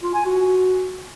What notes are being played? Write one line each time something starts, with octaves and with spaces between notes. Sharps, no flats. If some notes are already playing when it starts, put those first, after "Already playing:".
F4
G#5
F#4